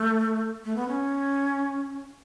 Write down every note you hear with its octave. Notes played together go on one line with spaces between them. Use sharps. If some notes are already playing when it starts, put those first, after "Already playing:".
Already playing: A3
A3
B3
C#4